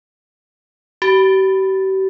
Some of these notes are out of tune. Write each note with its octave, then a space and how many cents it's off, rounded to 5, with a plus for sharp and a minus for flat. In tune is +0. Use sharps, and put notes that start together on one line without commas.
G4 -40